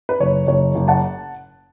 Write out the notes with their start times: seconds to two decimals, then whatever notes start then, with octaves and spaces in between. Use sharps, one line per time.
0.09 B4
0.20 F#1 C#5
0.47 F#1 C#5
0.75 F#1
0.88 F#5 A5